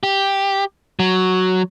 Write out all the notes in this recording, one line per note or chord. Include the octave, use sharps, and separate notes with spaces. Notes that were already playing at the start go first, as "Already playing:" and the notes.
G4
F#3